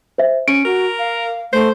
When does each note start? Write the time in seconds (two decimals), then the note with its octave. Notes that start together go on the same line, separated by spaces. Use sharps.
0.18 C5 E5
0.48 C#4 D7
0.65 F#4 A#4
0.99 F5
1.52 A3 C5